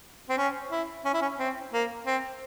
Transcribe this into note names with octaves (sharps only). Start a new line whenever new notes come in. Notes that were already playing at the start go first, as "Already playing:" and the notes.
C4
C#4
E4
C#4
E4
C#4
C4
A#3
C4